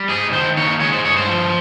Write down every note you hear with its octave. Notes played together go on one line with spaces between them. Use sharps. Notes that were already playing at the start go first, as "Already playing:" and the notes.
Already playing: G3
G#2 G#4
D#3 C5
A#3 C#5
G#3 C#5
C5
G2 C#5
C5
F3